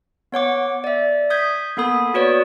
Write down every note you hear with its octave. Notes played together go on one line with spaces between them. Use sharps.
B3 C#5 F#5 D6
D5 E5
D#6 G6 G#6 B6
A#3 B3 A4 B5 D#6
F#4 B4 C#5 D5